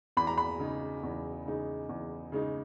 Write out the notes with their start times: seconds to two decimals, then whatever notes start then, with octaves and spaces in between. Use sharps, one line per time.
0.17 E2 B5
0.27 A#5
0.38 B5
0.60 C#3 G#3 D#4
1.03 E2
1.46 C#3 G#3 D#4
1.89 E2
2.32 C#3 G#3 D#4